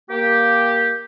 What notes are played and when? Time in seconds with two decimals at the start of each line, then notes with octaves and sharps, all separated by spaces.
0.09 A#3 G4